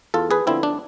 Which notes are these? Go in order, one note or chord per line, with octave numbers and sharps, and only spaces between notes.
E2 F4 A4
G#4 B4
D3 F3 B3 C4 E4
D4